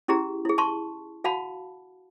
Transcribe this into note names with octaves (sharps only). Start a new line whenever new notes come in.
C#4 E4 G4 G#4 A#5
E4 G#4
A5 C6 C#6
F#4 F5 F#5 A5 B5